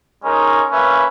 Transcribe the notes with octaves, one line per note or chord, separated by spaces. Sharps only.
G#3 C#4 D#4 A#4
A#3 C#4 B4 E5